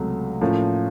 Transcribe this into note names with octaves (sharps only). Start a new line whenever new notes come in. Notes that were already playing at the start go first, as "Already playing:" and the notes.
Already playing: C#2 C3 F#3 A3
A2 F3 A#3 C#4